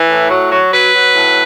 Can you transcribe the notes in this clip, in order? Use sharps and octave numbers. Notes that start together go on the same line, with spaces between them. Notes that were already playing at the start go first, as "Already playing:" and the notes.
Already playing: E3
A2
F#3
F#3
F#3 B4
F#3
A2